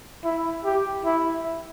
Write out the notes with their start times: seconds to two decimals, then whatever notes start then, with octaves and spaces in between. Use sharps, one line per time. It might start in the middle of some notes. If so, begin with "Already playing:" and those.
0.24 E4
0.65 G4
1.05 E4